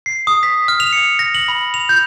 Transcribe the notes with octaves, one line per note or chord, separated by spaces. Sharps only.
C7
D#6
B6
F6
F7
C#7
A#6
F#7
B5
F7
G6